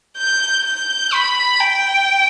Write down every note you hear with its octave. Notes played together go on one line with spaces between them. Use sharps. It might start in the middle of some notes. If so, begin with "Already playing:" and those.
G6
G6
B5
G5